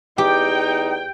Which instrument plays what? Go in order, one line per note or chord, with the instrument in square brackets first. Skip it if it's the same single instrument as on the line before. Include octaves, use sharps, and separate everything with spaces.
[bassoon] E2 [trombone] D#4 [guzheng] G4 [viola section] G5